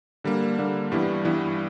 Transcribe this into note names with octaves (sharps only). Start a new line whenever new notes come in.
D3 G3 A#3
D3 G3 A#3
G2 E3 G3 B3 E4
G2 E3 G3 B3 E4